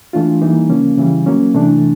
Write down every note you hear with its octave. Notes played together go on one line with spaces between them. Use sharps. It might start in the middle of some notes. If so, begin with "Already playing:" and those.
E3 A3 D4 F4
E3 G3 A#3 D#4
C#3 F3 A#3 C#4
C#3 E3 G3
F#3 A#3 C#4
C3 E3 A3 D4